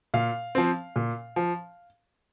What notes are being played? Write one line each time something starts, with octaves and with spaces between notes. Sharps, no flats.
A#2 F5
F3 C4
A#2
F3